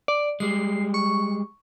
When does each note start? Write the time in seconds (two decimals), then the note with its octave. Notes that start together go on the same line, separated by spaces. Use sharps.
0.08 D5
0.40 G3 G#3 C7
0.94 C#6